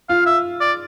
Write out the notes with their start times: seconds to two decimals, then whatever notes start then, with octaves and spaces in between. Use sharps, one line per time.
0.09 F4 F5
0.26 E5
0.60 D5